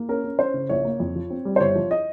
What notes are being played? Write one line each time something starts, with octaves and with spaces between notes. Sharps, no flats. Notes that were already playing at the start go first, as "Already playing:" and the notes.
Already playing: A#3
C#4 A#4
C#4
C#4 C5
C#3
A#1 C#5
A#3
F2
F3
C4
G3
C5
G1 C#5
F3
D#5